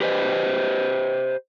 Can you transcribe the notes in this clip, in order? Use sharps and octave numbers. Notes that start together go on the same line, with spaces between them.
G4 B4 C5 D#5